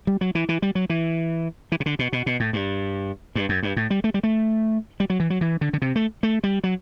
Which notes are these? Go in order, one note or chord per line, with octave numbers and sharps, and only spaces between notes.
G3
F#3
E3
E3
G3
F#3
E3
E3
C3
D3
B2
B2
B2
A2
G2
G2
F#2
G2
A2
G3
A3
G3
A3
G3
F#3
E3
F#3
E3
D3
D3
C3
A3
A3
G3
F#3